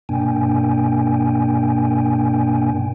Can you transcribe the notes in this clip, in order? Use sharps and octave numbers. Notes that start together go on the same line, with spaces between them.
G2 B2 A#3 D4 G5 G#5